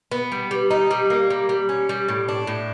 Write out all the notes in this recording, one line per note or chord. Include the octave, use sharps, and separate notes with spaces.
B3
G3
G3
D#4
G3
A#3
G3
G3
C#4
G3
A2
D4
A2